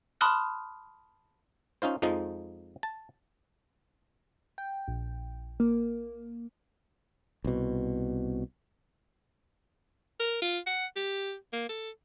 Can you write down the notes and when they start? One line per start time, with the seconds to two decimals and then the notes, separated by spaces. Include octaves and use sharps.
0.21 A5 B5 C6 D#6 F6 F#6
1.82 C#4 D#4 F4 C5
2.02 F2 F3 G#3 D#4
2.83 A5
4.58 G5
4.88 A#1
5.60 A#3
7.44 C2 B2
10.20 A#4
10.42 F4
10.67 F#5
10.97 G4
11.53 A#3
11.69 A4